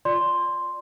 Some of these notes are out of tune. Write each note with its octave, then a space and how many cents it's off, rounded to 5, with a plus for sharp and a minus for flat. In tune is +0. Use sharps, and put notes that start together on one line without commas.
F4 +0 D5 +0 C6 +0